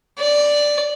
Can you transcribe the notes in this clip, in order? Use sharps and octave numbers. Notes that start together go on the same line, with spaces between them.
D5